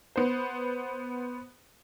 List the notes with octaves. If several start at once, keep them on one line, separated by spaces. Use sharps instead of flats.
B3 C5